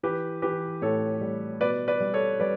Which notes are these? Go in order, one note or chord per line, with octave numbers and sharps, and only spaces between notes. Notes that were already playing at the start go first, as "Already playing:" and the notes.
E3 G4 B4
E3 G4 B4
A2 A4 C#5
G3
B2 B4 D5
B4 D5
G3
A4 C#5
G3 B4 D5